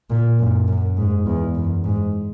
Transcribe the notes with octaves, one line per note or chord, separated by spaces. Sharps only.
A#2
F#2
F#2
G#2
E2
F#2
G#2